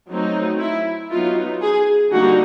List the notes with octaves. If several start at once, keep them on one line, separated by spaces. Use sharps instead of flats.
F#3 A3 C4 D#4
E4
F#3 B3 D#4 F4
G#4
D3 G3 A#3 D#4 F#4